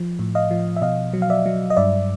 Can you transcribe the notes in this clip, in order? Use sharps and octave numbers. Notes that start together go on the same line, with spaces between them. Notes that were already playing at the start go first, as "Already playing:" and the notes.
Already playing: F3
A2
D#5 F5
F3
E5
B2 D#5 F5
F#3
F5
D5 E5
F#3
D#5
G2 D5 E5